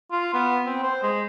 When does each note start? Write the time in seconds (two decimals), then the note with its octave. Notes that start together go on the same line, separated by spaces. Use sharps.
0.12 F4
0.34 B3
0.66 C4
0.83 C5
1.03 G#3